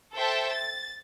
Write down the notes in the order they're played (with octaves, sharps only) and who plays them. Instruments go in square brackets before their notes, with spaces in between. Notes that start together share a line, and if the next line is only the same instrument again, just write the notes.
[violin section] A4 C5 E5 G5 A5
A6